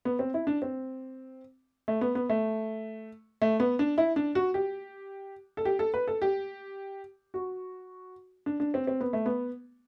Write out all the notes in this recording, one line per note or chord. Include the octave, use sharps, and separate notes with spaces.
B3
C4
E4
D4
C4
A3
B3
B3
A3
A3
B3
D4
E4
D4
F#4
G4
A4
G4
A4
B4
A4
G4
F#4
D4
D4
C4
C4
B3
A3
B3